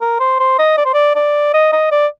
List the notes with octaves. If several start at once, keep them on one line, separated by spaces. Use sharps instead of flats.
A#4
C5
C5
D#5
D5
C5
D5
D5
D#5
D#5
D5